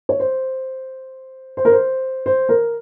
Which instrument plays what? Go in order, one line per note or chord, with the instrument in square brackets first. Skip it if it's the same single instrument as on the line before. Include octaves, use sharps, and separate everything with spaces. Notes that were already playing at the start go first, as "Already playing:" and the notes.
[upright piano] C#5
C5
C5
A#4
C5
C5
A#4